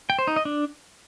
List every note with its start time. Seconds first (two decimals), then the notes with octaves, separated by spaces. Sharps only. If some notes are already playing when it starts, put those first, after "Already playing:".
0.10 G5
0.19 C5
0.27 D#4
0.36 D#5
0.45 D4